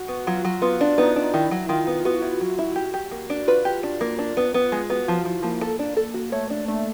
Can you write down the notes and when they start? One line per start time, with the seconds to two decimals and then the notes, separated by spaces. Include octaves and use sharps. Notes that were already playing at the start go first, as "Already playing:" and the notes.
Already playing: F#4
0.08 B3
0.26 F#3 F4
0.45 F#3
0.62 B3 F4
0.81 D4
0.98 B3 D#4
1.16 D4
1.34 D#3 E4
1.51 F#3
1.69 D#3 F4
1.87 B3
2.05 B3 F#4
2.22 E4
2.41 F#3
2.59 E4
2.76 G4
2.94 G4
3.11 A#3
3.30 D4
3.47 F4 B4
3.65 G4
3.83 D4
4.01 A#3
4.19 D4
4.37 B3
4.54 B3
4.72 G#3
4.89 B3 F#4
5.08 F3 F4
5.25 F3 E4
5.43 F3 A#3
5.61 A4
5.79 D4
5.97 A4
6.14 F#4
6.32 A3 C#5
6.50 D4
6.68 A3 D4